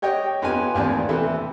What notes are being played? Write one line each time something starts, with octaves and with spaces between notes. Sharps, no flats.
G4 C#5 D#5 G5
F2 B3 G4 G#5
A1 D#2 C4 D5
C3 E3 E4 A4